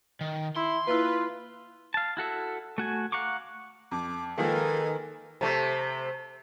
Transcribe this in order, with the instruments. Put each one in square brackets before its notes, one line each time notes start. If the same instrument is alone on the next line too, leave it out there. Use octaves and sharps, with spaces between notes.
[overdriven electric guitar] D#3
[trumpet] E4 [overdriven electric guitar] C6
[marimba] A#3 E4 [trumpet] F4 [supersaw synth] B4
[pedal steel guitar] F5 A5
E4 F#4 A4 E5
A3 F#4 G#5
F5 F#5 A#5 C#6 D6
[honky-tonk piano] F2 [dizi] D6
[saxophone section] D#3 [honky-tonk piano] F3 G#3 A#3 [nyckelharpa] A4 B4 [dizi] G#5
[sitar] C3 A3